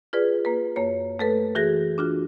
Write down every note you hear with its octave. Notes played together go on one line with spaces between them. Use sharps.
F4 G#4 B4 D5
A#3 B4
F#2 A#3 C#5
A3 A4 B4
E3 F#4 G#4 A#6
D4 F4 F#4